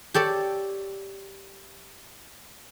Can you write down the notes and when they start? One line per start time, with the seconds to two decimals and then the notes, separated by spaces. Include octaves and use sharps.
0.14 G4 A4 C#5 D5